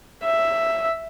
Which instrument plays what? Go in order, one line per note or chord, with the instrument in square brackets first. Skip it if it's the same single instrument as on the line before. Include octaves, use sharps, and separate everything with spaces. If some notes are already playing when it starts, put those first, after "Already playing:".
[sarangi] E5